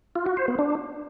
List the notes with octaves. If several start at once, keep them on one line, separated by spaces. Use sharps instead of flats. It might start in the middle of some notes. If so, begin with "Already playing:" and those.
F4
F#4
C5
B3
D4